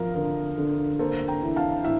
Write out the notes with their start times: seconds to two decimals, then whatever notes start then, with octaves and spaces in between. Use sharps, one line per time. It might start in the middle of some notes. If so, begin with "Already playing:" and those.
Already playing: F3 A#4 F5
0.15 D3 A#4
0.58 D3
0.99 A#3 A4 C5
1.28 G5 A#5
1.43 E3
1.56 F5 A5
1.84 A2 E5